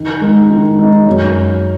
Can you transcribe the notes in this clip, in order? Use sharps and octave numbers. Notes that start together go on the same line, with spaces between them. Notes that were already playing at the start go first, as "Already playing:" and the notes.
Already playing: D#3
G#3 D#4
D#3
G#3 D#4
F#2